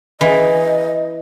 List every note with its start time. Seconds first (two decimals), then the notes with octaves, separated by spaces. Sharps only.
0.21 E3 D#5